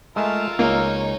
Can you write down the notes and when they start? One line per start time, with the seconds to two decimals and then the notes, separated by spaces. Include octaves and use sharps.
0.16 G#3 A3 F4 A#4 A5 E6
0.59 C#2 A#3 D#4 C#5